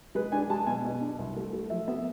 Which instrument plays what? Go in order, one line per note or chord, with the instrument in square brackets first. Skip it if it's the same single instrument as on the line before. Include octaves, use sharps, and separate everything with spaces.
[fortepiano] G#3 B4
D4 G#5
G#3 A5
B2 G#5
B2
D4
C2
A3
A3
F3 E5
B3 E5